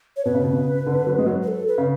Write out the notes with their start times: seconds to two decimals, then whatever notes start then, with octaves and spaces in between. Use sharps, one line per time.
0.17 C#5
0.25 B2 B4
0.35 C#3
0.44 B2
0.56 C#3
0.86 D3
1.07 F#3
1.19 G#3
1.27 F#3
1.42 B4
1.48 A4
1.68 B4
1.78 C#3